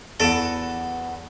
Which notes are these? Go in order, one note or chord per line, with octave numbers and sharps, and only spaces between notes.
E2 F#4 A4 B4 F#5 D7 E7